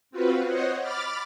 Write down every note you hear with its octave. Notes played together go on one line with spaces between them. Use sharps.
C4 F4 F#4 B4
C5 C#5 D#5 F#5
B5 D6 F6 A6